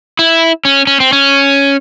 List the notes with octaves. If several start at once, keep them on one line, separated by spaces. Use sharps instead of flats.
E4
C#4
C#4
C4
C#4